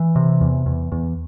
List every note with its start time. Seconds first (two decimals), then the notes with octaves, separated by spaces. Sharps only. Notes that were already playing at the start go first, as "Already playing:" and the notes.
Already playing: E3
0.16 C3
0.41 E2
0.66 E2
0.92 E2